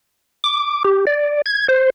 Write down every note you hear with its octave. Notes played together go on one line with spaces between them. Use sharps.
D6
G4
D5
G#6
C5